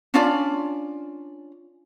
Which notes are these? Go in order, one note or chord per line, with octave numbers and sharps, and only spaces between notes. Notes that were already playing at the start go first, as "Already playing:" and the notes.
C#4 D4 F4 D5